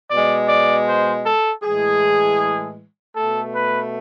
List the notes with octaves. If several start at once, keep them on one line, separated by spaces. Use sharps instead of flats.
B2 G#3 D5
D5
C5
A4
A2 E3 G#3 G#4
B2 A3 A4
B4